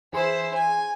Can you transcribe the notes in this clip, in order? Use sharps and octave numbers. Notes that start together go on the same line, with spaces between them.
E3 E4 G#4 C5 C6
G#5